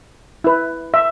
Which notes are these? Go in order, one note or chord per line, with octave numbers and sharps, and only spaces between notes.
E4 B4
E5